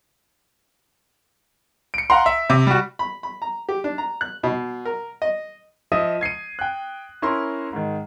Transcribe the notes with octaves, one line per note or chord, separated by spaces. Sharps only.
C#7 D7
F5 F#5 A#5 C6
E5
C3
G3 F#4
B5
B5
A#5
G4
D4
A#5
F#6
B2
A#4
D#5
F3 D#5 E5 D#6 D#7
G#6 C7 C#7 D#7
G5 F#6
C#4 E4 A#4 A#5 C6
G#2 D#3